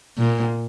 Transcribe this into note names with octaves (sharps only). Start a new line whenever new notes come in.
A#2